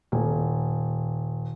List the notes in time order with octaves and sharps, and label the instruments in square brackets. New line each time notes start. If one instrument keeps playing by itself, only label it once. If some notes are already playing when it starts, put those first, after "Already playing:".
[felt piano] D#1